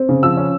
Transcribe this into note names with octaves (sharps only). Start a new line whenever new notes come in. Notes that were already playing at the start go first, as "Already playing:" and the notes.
Already playing: C4
C#3
F3 E6
C#4